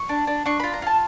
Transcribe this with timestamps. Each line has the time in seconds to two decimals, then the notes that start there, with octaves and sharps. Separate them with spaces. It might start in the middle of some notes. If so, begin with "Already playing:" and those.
Already playing: C#6
0.09 D4
0.27 D4
0.46 D4 C#6
0.60 F4 B5
0.74 A#5
0.82 F4 A5